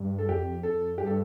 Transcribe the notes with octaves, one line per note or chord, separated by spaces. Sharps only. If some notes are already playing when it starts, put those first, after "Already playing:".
Already playing: G2
A4
F2 G4
A4
G2 G4
A4